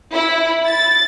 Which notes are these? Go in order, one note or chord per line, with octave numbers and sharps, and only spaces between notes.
E4
A6